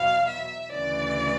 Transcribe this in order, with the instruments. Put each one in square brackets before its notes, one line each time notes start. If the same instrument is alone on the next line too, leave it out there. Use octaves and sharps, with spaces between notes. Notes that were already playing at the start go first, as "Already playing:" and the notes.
Already playing: [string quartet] E2 B2 F#3 B3 F5
E5
D2 C#3 E3 D5